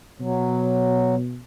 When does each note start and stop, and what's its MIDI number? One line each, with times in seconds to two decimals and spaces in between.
0.20 1.41 47
0.20 1.15 54